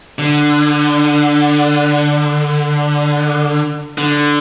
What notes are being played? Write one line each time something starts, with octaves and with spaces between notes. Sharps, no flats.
D3
D3